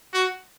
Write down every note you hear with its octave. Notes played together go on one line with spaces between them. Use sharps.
F#4